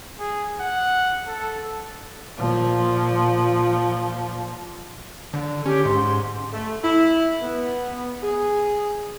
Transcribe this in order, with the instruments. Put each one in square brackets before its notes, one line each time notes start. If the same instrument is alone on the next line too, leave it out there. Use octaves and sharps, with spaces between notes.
[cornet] G#4
F#5
A4
[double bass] A#2 F3
[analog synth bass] D3
[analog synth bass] C#4 [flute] G4
[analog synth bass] G#2 [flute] C6
[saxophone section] A3
E4
B3
G#4